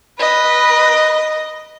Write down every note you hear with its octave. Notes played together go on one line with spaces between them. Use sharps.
B4 D#5